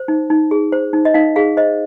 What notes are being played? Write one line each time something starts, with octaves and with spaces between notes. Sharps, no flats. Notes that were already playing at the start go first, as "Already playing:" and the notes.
Already playing: C5
D#4
D#4
G#4
C5
D#4
D#5
D#4 F5
G#4 F5
C5 D#5